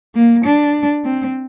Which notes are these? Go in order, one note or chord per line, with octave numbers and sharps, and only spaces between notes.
A#3
D4
C4